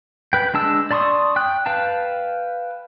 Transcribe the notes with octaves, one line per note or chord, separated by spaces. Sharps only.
B4 G5
G#3 D4 A5 E6
D5 A5 C6 C#6 D#6
G5 F#6
B4 F5 G5 A5